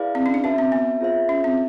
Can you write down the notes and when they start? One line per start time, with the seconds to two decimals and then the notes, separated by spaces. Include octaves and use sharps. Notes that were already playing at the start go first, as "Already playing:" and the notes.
Already playing: E4 G#4 B4 D5 F5
0.15 C4
0.26 C#4
0.34 D4
0.44 C#4 F#4 B4 E5 A5
0.58 C4
0.72 B3
1.01 F4 G#4 C5 E5
1.29 C#4
1.44 C4